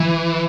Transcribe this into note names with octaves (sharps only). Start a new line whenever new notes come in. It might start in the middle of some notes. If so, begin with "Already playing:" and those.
Already playing: E3